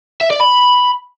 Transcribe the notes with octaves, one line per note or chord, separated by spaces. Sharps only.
E5
D5
B5